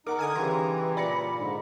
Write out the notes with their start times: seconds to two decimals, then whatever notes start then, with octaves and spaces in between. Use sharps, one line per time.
0.06 D#4 A#4 F#5 A#5 D6
0.19 D3 G#5 D#6 G#6
0.35 C#3 E3 G3 A#5 C6
0.97 A#2 D5 B5 A#6 C#7
1.35 G#2 D3